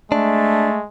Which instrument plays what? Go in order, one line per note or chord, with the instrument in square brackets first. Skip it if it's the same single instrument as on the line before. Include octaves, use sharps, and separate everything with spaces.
[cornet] G#3 [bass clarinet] A3 [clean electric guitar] D4